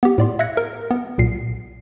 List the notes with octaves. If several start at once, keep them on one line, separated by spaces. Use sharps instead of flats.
B3 G4
A2 D5 C6
E5 F5 F#6 G#6 A#6 C#7
A#4
B3
B1 A#2 C7